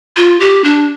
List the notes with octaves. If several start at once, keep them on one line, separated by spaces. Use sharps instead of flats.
F4
G4
D4